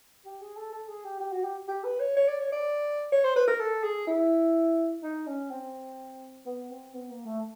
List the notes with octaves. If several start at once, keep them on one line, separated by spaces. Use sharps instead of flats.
G4
G#4
A4
A4
G#4
G4
G4
F#4
G4
G4
B4
C#5
C#5
D5
C#5
D5
C#5
C5
B4
A#4
A4
G#4
E4
D#4
C#4
C4
B3
C4
B3
A#3
A3